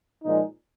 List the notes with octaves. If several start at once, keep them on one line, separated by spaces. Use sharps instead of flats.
A#2 F3 G#3 D#4